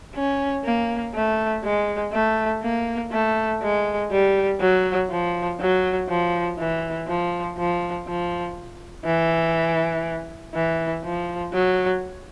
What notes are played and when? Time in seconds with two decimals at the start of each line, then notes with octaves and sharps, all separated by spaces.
0.15 C#4
0.64 A#3
1.15 A3
1.64 G#3
2.13 A3
2.63 A#3
3.12 A3
3.62 G#3
4.11 G3
4.61 F#3
5.10 F3
5.60 F#3
6.09 F3
6.59 E3
7.07 F3
7.58 F3
8.08 F3
9.05 E3
10.55 E3
11.04 F3
11.53 F#3